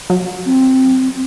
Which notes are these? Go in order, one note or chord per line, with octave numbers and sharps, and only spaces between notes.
F#3
C4